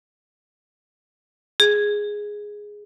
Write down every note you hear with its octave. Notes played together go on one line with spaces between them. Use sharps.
G#4